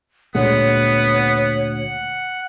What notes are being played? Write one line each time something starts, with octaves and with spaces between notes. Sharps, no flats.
D2 A#2 G#3 B3 C#5 F#5